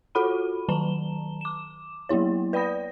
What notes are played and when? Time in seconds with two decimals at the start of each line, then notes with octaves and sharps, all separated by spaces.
0.15 F4 F#4 A4 F#5 B5 D#7
0.69 D#3 F#3 A5 A#5 E7 G7
1.41 D6 E7
2.09 F#3 A#3 B3 E4 C#5
2.53 B4 D5 G5 B5 D#6 A#6